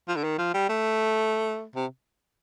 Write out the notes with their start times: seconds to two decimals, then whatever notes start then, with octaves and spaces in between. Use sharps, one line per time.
0.08 F3
0.16 D3
0.24 D#3
0.38 F3
0.54 G3
0.69 A3
1.75 C3